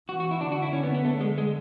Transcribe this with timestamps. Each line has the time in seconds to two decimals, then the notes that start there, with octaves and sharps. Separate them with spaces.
0.08 E3 F#4
0.20 F#4
0.31 E4
0.41 D3 D4
0.52 F#4
0.62 E4
0.73 D3 C#4
0.83 B3
0.94 B3
1.05 A3
1.21 G#3
1.38 G#3